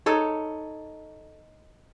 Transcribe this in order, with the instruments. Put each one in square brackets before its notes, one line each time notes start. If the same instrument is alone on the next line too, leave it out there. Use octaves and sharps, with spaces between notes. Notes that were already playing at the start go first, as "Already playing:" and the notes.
[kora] D#4 A4 C#5